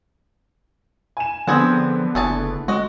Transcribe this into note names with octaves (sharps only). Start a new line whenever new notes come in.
G#5 E7
D3 F3 B3 C4 G#4 F#5
F#1 A3 G#4 A5
G#3 F#4 D#5